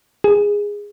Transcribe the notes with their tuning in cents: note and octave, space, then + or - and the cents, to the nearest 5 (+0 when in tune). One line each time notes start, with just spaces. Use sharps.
G#4 -15